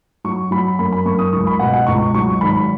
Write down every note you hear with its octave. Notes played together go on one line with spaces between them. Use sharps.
F#3 C#6
F#3 B5
F#2 B5
B5
F#2 C#6
D#6
C#2 C#6
B5
B2 F#5
F#5
C#2 C#6
F#3 C#6
G#1 B5